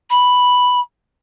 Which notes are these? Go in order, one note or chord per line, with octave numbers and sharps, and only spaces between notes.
B5